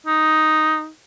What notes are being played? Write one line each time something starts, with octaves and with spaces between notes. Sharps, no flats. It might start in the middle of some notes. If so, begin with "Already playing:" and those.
D#4